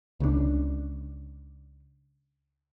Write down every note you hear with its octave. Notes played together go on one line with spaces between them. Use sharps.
C#2 C#3 G3 D4